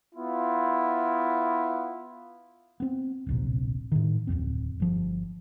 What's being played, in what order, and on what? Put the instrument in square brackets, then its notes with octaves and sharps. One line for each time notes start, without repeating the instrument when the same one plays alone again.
[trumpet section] B3 E4 F4
[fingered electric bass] B3 C4
D1 A#1 C3
A2 D#3
D1 G1 F2 C4
G1 F3